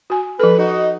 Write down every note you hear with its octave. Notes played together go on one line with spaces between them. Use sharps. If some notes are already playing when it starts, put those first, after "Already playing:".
F#4 G#5
F3 A4 B4
D#4 F#4